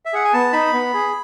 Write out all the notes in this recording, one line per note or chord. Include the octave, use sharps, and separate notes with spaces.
E5
G#4 F#5
G#5
B3 A5
D#4 B5
B3
G#4